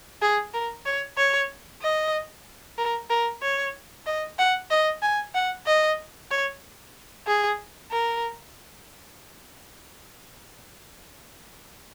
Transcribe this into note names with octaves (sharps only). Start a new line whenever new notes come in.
G#4
A#4
C#5
C#5
D#5
A#4
A#4
C#5
D#5
F#5
D#5
G#5
F#5
D#5
C#5
G#4
A#4